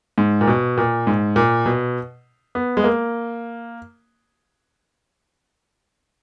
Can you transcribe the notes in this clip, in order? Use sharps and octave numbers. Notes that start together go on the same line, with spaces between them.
G#2
A#2
B2
A#2
G#2
A#2
B2
B3
G#3
A#3